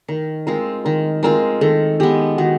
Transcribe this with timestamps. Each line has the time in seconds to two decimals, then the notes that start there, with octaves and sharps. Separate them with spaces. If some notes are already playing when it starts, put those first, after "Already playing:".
0.09 D#3 A#4
0.47 G#3 C4 F4 A#4
0.85 D#3 A#4
1.23 G#3 C4 F4 A#4
1.61 D#3 A4
2.00 G#3 B3 G4
2.38 D#3 F#4